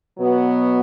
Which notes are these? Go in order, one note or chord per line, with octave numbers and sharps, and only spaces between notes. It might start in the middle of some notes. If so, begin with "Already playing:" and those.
B2 F#3 B3 F#4